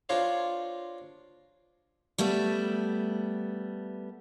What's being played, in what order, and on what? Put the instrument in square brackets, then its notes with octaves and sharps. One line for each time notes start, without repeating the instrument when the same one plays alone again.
[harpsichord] D4 F4 A#4 C5 C#5
[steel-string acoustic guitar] G3 A3 B3 E5